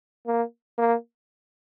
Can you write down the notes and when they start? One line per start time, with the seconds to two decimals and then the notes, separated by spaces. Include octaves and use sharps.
0.27 A#3
0.78 A#3